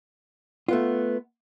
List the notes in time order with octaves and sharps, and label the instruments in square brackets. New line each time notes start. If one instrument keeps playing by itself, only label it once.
[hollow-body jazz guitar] A3 B3 F4